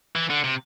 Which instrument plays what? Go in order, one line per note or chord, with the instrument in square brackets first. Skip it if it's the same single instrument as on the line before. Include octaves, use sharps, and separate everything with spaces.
[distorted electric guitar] E3
D3
C3